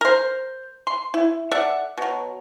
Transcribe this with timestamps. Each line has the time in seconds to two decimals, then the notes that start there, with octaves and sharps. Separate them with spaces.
0.01 A#4 C5
0.87 C6
1.14 E4
1.51 A4 D5 E5 F#5
1.98 B2 F#3